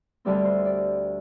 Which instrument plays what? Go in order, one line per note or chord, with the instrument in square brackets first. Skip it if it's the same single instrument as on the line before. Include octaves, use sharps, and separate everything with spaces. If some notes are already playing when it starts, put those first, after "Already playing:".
[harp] D2 D3 G3 C4 D5
C5
D5